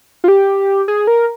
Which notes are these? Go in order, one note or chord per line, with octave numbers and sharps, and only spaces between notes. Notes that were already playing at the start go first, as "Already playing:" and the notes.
F4
G4
G#4
A#4